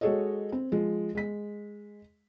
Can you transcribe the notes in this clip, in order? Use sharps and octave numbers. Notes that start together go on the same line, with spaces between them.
G#3 F#4 G#4 A4 C#5 D#5
C4
F3 G#3
G#3 B6